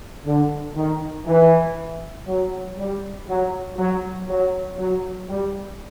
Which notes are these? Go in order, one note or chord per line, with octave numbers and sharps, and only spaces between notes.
D3
D#3
E3
F#3
G3
F#3
F#3
F#3
F#3
G3